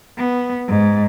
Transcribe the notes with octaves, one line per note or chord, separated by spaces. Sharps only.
B3
G#2